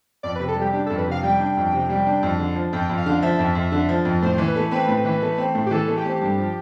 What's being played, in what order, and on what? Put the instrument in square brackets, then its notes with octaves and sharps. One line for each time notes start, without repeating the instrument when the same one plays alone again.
[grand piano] F2 [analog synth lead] D5
[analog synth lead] B4
[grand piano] C3
[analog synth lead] A4
[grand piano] G3
[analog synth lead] G4
[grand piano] D4 [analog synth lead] G4
[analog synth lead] A4
[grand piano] F2
[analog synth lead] B4
[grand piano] C3 [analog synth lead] F5
[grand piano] G3 [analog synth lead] G5
[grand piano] D4
F2
C3
G3
D4
F2
D3
F3
[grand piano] F2 [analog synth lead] G5
[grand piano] F2
[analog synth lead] F5
[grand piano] D3
[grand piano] F3 [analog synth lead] E5
[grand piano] F2
F2
D3
F3
F2
[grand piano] A2 [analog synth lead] C5
[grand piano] E3
[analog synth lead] B4
[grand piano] A3
[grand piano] C4 [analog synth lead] B4
[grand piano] A2
E3
A3
C4
A2
[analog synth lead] G4
[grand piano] E3 [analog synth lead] A4
[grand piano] A3
[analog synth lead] G4
[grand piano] C4
G2
F3